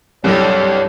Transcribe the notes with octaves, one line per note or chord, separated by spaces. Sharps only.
C2 G2 F#3 C4 A4 C#5